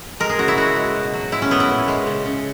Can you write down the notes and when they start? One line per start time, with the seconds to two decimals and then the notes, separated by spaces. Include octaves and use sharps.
0.20 G#3 A#4
0.29 G#4
0.39 C#3 F#4
0.48 E4
0.57 G#3 F#4
0.76 G#3
0.95 B2
1.14 F#3
1.32 G#3 E4
1.42 C#4
1.51 A#2 B3
1.60 E4
1.70 A#2
1.88 G#3
2.07 C#3
2.26 C#3